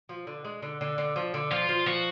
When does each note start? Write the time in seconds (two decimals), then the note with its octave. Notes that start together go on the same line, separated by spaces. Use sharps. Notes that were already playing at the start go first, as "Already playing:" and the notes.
0.09 F3
0.27 D3
0.44 G#3
0.62 D3
0.81 D3
0.98 D3
1.16 F3
1.34 D3
1.51 F3 F4
1.69 F3
1.86 F3 F#4